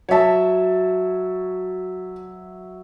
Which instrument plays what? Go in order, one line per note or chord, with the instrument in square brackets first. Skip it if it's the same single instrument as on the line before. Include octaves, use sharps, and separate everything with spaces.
[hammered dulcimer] F#3 E5 [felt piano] C#5 A5